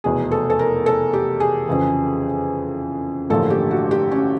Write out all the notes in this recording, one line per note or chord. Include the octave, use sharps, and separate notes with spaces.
F1 E2 B2 G#4
A4
A4
A#4
A4
G4
G#4
F2 C#3 E3
A1 G2 D3 F3 A#3 A4
G4
F#4
G4
C#4